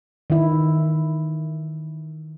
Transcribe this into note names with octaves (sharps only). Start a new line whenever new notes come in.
D#3 E4